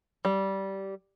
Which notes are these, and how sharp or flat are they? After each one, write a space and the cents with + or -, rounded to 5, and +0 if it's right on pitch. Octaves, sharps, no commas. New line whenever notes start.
G3 -15